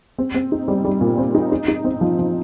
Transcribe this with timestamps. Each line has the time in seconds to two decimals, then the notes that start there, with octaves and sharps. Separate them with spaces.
0.18 C4
0.34 C4
0.52 D#4
0.68 G3
0.85 G3
1.01 A#2
1.18 C4
1.35 D#4
1.52 D#4
1.68 D#4
1.85 C4
2.01 F3
2.19 F3